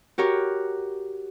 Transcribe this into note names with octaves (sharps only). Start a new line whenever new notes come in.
F#4 G4 A#4 C#5